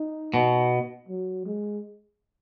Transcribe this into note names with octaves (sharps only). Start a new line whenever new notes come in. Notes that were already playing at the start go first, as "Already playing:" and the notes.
Already playing: D#4
B2
F#3
G#3